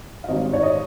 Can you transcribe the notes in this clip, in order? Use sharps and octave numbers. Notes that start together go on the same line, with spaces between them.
F5
G#1 G#2 G3 C#4 D#5
C#5
D#5